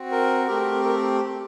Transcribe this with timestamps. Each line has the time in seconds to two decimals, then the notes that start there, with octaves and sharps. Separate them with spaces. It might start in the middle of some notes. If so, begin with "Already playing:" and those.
Already playing: C4 F#4
0.11 A#4
0.47 A3 C4 G4 A#4
0.84 A#4